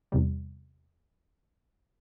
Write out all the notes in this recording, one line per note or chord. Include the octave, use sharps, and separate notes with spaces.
E2 C3 G3